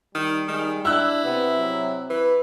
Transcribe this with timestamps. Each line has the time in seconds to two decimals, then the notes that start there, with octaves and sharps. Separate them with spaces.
0.15 D#3 G3
0.48 D#3 G#3
0.85 D4 E4 E6 F#6
1.24 C3 B3
1.58 F#3
2.10 E3 B4